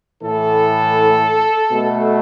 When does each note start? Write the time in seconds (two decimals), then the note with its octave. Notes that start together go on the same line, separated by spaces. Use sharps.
0.22 A2 E3 A3 A4
1.71 B2 A3